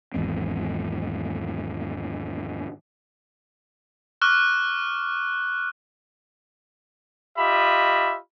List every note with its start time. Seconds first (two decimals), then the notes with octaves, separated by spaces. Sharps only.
0.14 G#1 E2 G#2 C4
4.21 C#6 D6 F6 F#6
7.38 F4 G4 D#5 E5 B5